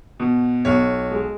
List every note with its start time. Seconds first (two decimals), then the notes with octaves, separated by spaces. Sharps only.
0.20 B2
0.65 B1 C#5
1.11 G#3